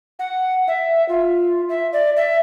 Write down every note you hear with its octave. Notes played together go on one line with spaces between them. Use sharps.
F#5
E5
F4
E5
D5
E5